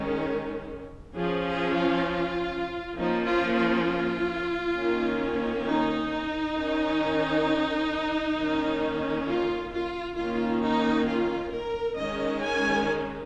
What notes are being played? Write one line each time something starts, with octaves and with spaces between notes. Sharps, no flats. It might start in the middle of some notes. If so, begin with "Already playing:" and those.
Already playing: D#3 G#3 C#4
F3 C#4 G#4
G#4
F4
F3 A#3 C#4 D#4
F4
F4
D#3 A#3 C#4
D#4
D#3 C#4
D#3 A#3 C#4
F4
F4
D#3 A#3 C#4 F4
D#4
F4
A#4
D#3 G#3 C#4 D#5
G#5